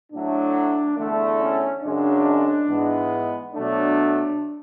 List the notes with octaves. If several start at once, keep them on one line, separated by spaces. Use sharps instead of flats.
A2 F#3 A3 D4
E2 D3 A3
C#4
F#2 C#3 G#3 D4
G#2 E3 G#3 B3
B2 F#3 A3 D4